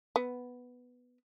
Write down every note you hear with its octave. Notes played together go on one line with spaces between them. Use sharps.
B3